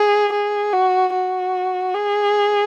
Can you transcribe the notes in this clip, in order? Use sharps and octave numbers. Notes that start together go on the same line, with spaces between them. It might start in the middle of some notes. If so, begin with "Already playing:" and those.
Already playing: G#4
G#4
F#4
F#4
G#4